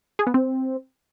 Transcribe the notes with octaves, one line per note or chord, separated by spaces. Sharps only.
G#4
B3
C4